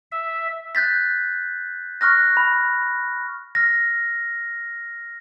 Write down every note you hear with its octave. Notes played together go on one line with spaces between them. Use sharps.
E5
F#6 G6 A6 B6
C#6 F6 F#6 A#6
B5
F6 A#6